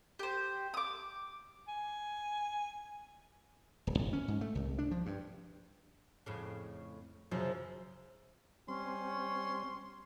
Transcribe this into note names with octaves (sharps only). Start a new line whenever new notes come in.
G4 C5
D6 D#6
G#5
D1
G1
C#4
G#2
A3
C2
D4
F3
G2
F2 A2 C#3
F#2 C#3 F3
G3 C4 C#4 C6